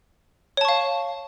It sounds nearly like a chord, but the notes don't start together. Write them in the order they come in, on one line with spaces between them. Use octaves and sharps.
C#5 A5 C#6 F5